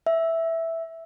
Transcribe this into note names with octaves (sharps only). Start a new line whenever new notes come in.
E5